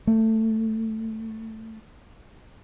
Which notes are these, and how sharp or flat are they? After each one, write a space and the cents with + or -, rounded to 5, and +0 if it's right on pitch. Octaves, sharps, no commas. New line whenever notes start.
A3 +15